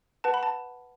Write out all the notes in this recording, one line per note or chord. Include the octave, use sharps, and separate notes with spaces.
B4 F#5 A5
B5
A5